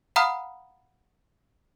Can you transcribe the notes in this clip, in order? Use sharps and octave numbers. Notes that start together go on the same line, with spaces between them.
F5 F#5 A#5 B5 D#6 F6